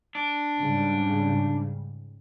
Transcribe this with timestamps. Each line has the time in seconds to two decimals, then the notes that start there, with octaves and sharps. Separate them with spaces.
0.15 D4
0.60 G#2 C#3 G3